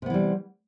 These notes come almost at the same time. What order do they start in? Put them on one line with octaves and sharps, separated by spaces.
C3 B3 E3 G3